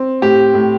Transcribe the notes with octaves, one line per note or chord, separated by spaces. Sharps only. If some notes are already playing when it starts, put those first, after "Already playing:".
Already playing: C4
A2 G4
A2